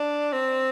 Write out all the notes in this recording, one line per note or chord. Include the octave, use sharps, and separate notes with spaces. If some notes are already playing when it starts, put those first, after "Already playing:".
Already playing: D4
C4